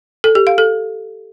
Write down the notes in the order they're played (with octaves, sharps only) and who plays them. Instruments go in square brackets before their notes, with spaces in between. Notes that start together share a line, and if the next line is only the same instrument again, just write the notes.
[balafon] A4
G4
F5
A4